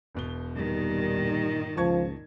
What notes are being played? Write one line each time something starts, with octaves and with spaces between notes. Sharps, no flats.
E1 B2 G7
G2 A#2 D#3 G3
C#2 F3 A5 C#6 G#6